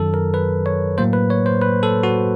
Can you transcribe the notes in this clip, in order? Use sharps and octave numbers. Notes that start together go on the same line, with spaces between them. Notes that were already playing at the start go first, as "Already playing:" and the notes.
Already playing: F#2 D#3 F#3 A4
A#4
B4
C#5
A2 F#3 A#3 C5
B4
C#5
C5
B4
A4
F#4